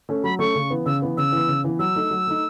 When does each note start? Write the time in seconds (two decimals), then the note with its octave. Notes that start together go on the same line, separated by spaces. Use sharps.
0.09 A3 C#4
0.24 F#3 B5
0.39 A3 C#4 C#6
0.55 C#3
0.70 E3 B3
0.86 C#3 E6
1.02 E3 B3
1.17 C#3 E6
1.32 E3 B3
1.48 C#3
1.64 E3 B3
1.79 F#3 E6
1.95 A3 D#4
2.10 F#3
2.27 A3 D#4